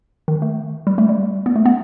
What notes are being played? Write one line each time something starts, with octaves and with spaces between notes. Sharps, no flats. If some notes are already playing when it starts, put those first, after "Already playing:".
D#3
A3
G3
A3
G3
B3
A3
B3